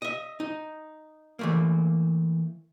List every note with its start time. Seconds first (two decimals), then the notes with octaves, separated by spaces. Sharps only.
0.02 D#5 E5
0.40 D#4
1.39 E3 A3 A#3